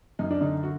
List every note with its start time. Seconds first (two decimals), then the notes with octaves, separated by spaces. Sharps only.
0.19 F#2 D#4
0.31 D4
0.41 D3 D#4
0.63 F#4